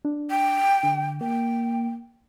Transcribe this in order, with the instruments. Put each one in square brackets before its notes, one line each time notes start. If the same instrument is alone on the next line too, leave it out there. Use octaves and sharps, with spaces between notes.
[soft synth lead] D4
[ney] G5
[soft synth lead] D3
[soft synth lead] A#3 [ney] G5